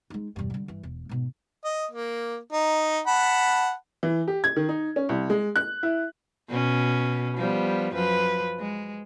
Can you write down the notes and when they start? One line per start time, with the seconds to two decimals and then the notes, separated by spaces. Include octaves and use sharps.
0.10 G#3 D#4
0.36 E1 G2
0.50 D3 G3
0.68 G2 E3
0.83 E1
1.09 G#2 B2
1.64 D#5
1.91 A#3
2.53 D#4
3.07 F#5 A5 B5
4.03 E3
4.28 G4
4.44 G#6
4.56 D#3
4.69 D#4
4.96 C#4
5.09 C2
5.30 G#3
5.56 F#6
5.83 E4
6.49 B2 C#4
7.37 F3 G3 B3
7.94 F#2 F3 B4
8.60 G#3